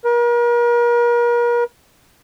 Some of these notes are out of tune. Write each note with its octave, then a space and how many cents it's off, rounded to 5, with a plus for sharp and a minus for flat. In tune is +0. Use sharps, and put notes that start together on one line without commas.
A#4 +40